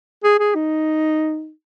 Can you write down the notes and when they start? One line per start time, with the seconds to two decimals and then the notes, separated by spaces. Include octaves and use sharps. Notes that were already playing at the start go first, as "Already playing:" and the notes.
0.24 G#4
0.39 G#4
0.55 D#4